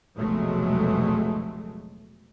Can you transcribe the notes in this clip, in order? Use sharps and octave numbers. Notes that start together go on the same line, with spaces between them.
F1 C#2 B2 F#3 G#3 A3